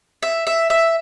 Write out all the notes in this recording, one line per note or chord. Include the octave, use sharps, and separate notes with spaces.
E5
E5
E5